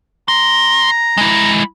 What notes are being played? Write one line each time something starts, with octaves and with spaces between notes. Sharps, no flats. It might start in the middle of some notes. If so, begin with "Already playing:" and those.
A#5 C6
G#3 E4